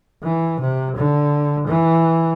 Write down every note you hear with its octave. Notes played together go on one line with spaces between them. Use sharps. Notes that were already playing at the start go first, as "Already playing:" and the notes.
E3
C3
D3
E3